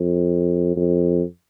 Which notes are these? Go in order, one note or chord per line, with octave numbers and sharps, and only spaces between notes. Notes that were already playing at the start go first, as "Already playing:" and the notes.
Already playing: F2
F2